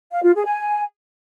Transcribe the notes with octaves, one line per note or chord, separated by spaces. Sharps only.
F5
F4
G#4
G#5